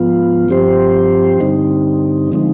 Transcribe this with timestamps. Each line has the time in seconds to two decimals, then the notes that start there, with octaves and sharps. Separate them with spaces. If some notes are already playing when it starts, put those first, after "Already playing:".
Already playing: G#2 F3 B3 F4
0.48 G2 F3 C4 G4 C5
1.40 G2 D3 G3 C4 D#4
2.32 D3 F3 G#3 C4 D#4